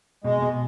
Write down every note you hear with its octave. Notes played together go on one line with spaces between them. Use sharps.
B2 G#3
B2